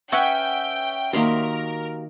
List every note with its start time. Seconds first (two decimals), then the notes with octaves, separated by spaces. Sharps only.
0.12 C#4 B4 E5 F#5 G5
1.13 D#3 A#3 F#4 G4 A#4 B5 C6